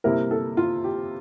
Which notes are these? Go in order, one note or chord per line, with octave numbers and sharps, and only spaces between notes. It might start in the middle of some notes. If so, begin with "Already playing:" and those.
C3 G3 A#3 E4 A#4
A4
F4
G4